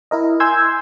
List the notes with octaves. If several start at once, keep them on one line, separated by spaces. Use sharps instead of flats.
E4 A#4 D#5
G#5 C6 E6 G6 G#6